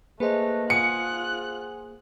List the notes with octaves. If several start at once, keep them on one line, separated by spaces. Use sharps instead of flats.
A3 A#3 G#4 B4 C5 D#5
F4 F#5 G#5 D#6 F#6 C#7